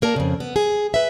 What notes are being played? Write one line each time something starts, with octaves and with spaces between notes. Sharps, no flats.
A#3 A#4 D5 A5
F2 C#3
B3
G#4
B4 E5